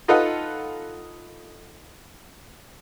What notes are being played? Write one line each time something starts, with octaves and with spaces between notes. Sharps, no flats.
D#4 F4 A4 B4 D#5 F#5